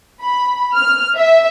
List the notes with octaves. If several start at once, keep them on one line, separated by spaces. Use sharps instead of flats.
B5
F6
E5